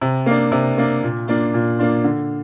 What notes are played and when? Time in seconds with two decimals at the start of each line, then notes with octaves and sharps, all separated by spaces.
0.01 C3
0.26 A#3 D4
0.52 C3
0.78 A#3 D4
1.03 A#2
1.28 A#3 D4 F4
1.54 A#2
1.79 A#3 D4 F4
2.04 D3